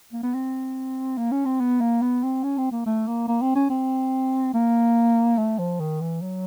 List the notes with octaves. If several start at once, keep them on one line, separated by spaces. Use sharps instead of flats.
A#3
B3
C4
A#3
C#4
C4
B3
A#3
B3
C4
C#4
C4
A#3
A3
A#3
A#3
C4
C#4
C4
A#3
A3
F3
D#3
E3
F#3